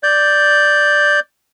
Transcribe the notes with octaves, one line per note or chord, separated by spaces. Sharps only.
D5 G6